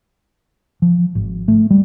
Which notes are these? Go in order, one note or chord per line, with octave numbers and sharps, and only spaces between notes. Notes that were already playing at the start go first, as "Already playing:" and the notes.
F3
G#1
A3
G3